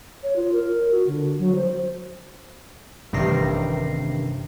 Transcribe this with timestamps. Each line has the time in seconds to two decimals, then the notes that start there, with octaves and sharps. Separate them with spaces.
0.23 C#5
0.36 F4
0.52 A#4
0.91 F#4
1.07 D3
1.39 F#3
1.55 C5
3.13 A1 G2 C3 D#3 A#6 C7